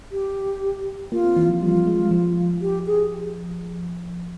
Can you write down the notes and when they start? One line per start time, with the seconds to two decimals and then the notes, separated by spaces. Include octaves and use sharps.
0.12 G4
1.12 A#3 F4
1.24 C4
1.36 E3
1.49 F3
1.62 G3 F4
1.87 G#3
2.11 F3
2.61 G4
2.87 G#4